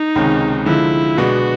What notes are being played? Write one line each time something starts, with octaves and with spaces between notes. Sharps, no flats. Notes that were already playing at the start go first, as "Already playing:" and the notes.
Already playing: D#4
C#2 C3 D#3 G#3 C#4
D3 F3 G#3 E4
B2 G#3 B3 D4 F#4